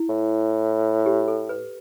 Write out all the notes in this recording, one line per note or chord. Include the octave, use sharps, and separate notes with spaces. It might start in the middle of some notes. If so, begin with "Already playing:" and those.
Already playing: E4
A2
G4
A4
B4